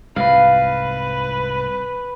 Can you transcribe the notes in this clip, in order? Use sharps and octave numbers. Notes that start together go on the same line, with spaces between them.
C2 G#2 B4 F5